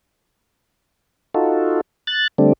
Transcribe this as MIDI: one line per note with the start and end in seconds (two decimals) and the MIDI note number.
1.34 1.81 63
1.34 1.81 65
1.34 1.81 66
1.34 1.81 69
2.07 2.27 90
2.07 2.27 93
2.38 2.53 50
2.38 2.53 55
2.38 2.53 57
2.38 2.53 60
2.38 2.53 62